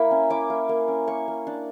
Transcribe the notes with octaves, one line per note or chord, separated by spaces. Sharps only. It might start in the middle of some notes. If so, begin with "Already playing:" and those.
Already playing: A#3 E4 B5
C#4
E4 D6
A#3
A#3
C#4
A#3 C#6
A#3
D4